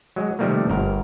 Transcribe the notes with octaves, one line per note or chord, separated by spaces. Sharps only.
F#3 G#3
C3 D#3 F3 G3 A3 A#3
G1 A#4